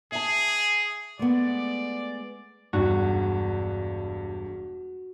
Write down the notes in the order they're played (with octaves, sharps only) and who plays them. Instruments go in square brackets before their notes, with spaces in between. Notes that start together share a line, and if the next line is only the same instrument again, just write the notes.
[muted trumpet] G#4 [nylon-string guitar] E5 A5
[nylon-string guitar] G#3 A3 B3 [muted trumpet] D5
[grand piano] E1 G2 [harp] F#4